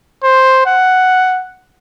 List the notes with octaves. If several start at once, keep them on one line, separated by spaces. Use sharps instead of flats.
C5
F#5